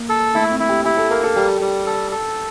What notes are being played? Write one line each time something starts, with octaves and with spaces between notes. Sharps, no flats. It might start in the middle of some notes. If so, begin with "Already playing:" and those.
Already playing: A#3
A4
A3 E4
C4
E4
G4
E4 G4
A4
A#3 A#4
A4
G3 G4
G3
A4
A4